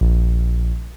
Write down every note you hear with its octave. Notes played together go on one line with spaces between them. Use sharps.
A#1